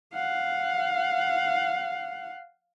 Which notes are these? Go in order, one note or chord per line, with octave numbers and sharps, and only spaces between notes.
F5 F#5